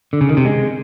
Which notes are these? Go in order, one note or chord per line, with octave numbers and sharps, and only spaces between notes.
D3
C#3
D#3
C3
G#3